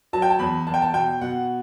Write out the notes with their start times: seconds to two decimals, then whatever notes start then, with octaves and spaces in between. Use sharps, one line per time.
0.13 F#3 A5
0.22 G5
0.30 A5
0.39 E2 B5
0.67 E2 A5
0.74 G5
0.82 A5
0.93 B2 G5
1.21 B2 F#5